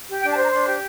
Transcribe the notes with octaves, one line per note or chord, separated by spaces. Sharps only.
G4
D4 G5
A5
C5 A#5
D4 C6
G4